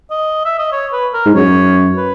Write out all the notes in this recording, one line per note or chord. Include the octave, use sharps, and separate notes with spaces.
D#5
E5
D#5
C#5
B4
A#4
G#2
F#2 C#5
B4